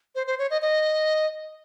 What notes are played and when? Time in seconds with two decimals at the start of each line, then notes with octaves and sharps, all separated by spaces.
0.15 C5
0.27 C5
0.39 C#5
0.50 D#5
0.62 D#5